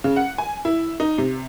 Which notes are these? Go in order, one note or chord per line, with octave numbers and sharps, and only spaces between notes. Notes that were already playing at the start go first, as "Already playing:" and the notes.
C#3
F#5
G#5
E4
D#4
C3